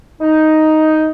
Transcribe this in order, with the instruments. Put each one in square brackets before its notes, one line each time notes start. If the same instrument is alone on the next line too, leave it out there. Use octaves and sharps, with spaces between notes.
[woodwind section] D#4